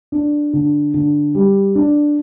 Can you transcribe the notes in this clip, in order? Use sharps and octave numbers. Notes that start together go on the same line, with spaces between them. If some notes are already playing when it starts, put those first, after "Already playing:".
D4
D3
D3
G3
D4